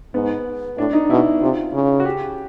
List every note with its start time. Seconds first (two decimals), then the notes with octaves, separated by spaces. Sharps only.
0.14 G#2 B3
0.77 A2 D4
0.93 D#4
1.10 B2 E4
1.42 C3 F4
1.74 C#3
2.00 F#4
2.05 G4